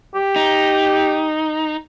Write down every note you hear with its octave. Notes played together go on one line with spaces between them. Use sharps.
G4
D#4